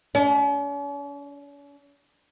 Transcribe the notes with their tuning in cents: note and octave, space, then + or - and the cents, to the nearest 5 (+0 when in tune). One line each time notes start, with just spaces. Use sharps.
C#4 +45